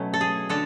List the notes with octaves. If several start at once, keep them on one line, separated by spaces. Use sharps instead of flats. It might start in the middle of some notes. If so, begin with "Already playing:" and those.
Already playing: B2 F#3 A3 C#4
A4
G#4
D3 A4